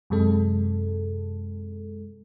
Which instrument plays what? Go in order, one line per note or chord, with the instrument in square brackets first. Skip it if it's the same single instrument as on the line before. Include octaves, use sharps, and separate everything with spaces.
[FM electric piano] F#2 C3 G#3 A4